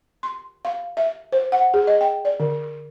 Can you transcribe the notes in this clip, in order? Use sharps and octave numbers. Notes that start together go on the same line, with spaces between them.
C6
F5
E5
C5
F#5
G#4
D#5
G5
D5
D3